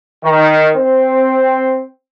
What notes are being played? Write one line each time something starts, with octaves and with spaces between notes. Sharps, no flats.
D#3
C4